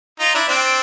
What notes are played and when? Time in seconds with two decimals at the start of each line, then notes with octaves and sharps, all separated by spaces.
0.20 D#4 F4
0.35 D4 E4
0.48 C4 D4